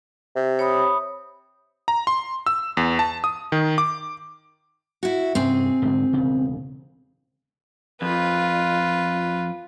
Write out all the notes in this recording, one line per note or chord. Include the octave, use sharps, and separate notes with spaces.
C3
C#5 B5 D#6
A#5
C6
E6
E2
A5
D#6
D#3
D6
E4 F#4
G2 C3 C4 C#4 G#4
G#2 D3
E1 C#3
F2 F4 B4